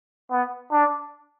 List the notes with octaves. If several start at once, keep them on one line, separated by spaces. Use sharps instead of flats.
B3
D4